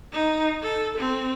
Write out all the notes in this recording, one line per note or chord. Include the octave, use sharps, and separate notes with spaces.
D#4
A4
C4